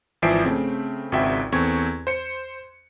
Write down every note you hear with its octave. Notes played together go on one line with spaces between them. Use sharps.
G#1 E3 F3 E5 C7 D7
C#3 A3 C4
G#1 C#2 C4 F#4 E5 G5
E2 C4 A4 C#6 G#6
C5 C#7